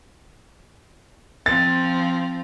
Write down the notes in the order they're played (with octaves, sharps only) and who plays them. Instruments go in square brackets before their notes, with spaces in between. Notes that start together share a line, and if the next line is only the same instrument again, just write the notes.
[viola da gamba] F3 C4 [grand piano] A6